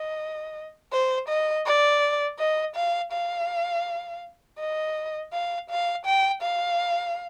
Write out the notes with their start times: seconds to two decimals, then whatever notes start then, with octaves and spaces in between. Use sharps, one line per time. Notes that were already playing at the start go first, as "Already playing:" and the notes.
Already playing: D#5
0.93 C5
1.29 D#5
1.66 D5
2.39 D#5
2.76 F5
3.13 F5
4.59 D#5
5.33 F5
5.70 F5
6.06 G5
6.42 F5